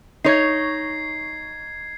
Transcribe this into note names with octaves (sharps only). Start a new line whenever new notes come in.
D#4 C#5 G#6 C7